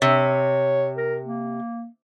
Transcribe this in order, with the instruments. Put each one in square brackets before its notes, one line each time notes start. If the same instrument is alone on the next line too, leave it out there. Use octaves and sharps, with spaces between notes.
[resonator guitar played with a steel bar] C3 [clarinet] C#5
[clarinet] A#4
A#3